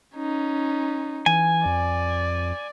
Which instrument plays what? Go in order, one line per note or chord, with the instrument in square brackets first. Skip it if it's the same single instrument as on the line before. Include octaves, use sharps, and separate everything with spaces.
[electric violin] C#4 D#4
[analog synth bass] E3 [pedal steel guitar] G#5
[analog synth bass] F2 [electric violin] D5